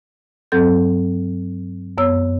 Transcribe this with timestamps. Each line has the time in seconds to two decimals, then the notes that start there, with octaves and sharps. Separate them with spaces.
0.52 G2 F#3 C4 A4 G6
1.98 F#2 B3 C#5 E6